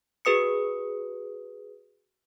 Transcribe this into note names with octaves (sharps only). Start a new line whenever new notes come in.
F#4 G#4 B4 D#6 C#7